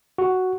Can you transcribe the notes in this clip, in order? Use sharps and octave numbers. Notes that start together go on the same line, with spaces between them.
F#4